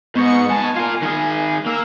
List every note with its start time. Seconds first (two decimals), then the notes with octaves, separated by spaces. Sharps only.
0.15 G#2 B3 D#4 C#6 C#7
0.49 B3 G#5 A5
0.76 F4 A#4
1.02 D#3 G#4
1.66 A#3 A#4 E6